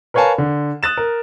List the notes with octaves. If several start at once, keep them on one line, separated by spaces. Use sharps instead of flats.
A#4 B4 C#5 F5 G#5 A5
D3
D#6 F#6 A6 E7
A#4